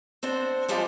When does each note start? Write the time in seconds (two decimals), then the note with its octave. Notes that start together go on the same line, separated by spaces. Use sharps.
0.23 C4 D4 C5 F#5
0.69 F3 G3 G#3 D4 F4 G4